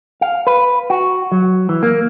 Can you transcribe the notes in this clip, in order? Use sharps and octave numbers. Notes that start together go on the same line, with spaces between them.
F5
B4
F#4
F#3
E3
A#3